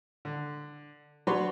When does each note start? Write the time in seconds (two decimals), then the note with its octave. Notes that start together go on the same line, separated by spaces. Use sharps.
0.25 D3
1.27 F#3 D4 F#4 B4 C#5 C6